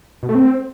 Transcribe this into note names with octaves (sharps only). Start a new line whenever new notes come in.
B2
A3
C4